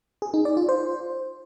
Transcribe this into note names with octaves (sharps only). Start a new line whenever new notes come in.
G#4
D#4
D5
F4
C5